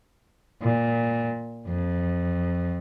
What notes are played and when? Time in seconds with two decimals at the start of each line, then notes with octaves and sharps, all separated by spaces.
0.62 A#2
1.67 F2